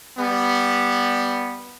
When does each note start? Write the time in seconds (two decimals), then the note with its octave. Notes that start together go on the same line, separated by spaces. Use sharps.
0.18 G3 B3